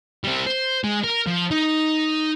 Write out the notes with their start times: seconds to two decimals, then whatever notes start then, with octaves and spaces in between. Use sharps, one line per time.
0.24 G3 C4
0.46 C5
0.84 G#3
1.04 A#4
1.27 F3
1.51 D#4